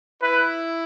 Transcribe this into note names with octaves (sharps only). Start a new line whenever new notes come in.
E4 B4